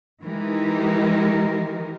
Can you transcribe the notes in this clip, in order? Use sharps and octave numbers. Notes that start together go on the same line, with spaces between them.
E3 G#3 D#4 G4 A#4